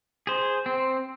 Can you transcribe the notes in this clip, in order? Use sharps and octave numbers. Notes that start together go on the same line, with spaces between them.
G#4 C5
C4